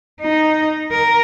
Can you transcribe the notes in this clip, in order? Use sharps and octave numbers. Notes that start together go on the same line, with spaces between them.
D#4
A#4